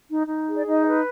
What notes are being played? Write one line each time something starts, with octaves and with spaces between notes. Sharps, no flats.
D#4
D#4
G#4
D5
D#4 D#5
B4